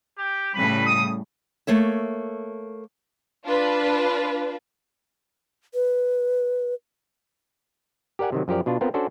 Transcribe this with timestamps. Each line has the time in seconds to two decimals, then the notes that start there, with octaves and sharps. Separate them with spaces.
0.18 G4
0.55 A2 C#3 G3 B4 B5
0.86 D#6
1.67 A3 A#3 C#5 E5
3.45 D4 F4 B4
5.74 B4
8.19 G4 A#4 D5 F#5 G#5
8.32 C3 D#3 F#3
8.48 F#2 F3 G4 A#4 D5
8.66 B2 D4 F4
8.81 B3 C4 F4 A#4
8.94 C#4 D4 F#4 A4 C5 D5